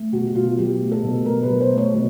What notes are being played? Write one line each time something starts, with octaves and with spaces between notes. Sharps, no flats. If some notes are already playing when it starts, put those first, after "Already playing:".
Already playing: A3
B2 F#4
F#4
B2 F4
F#3 G4
A3
A4
B2
B2 A#4
B4
F#3
C5
A3
C#5
B2